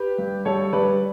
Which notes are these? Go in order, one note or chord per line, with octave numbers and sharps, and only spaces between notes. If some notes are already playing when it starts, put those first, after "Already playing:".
Already playing: G4 B4
G2
G2 A4 C#5
G2 B4 D5